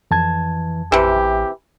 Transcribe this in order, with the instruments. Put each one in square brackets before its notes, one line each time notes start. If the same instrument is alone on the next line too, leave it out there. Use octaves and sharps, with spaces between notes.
[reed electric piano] F2 A5 G#6 [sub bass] E3
[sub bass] A1 [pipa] C3 E3 [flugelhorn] G4